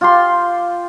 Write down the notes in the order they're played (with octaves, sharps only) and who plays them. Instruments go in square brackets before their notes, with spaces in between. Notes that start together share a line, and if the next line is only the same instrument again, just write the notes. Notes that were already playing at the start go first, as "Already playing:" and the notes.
[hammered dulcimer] F4 G4 C6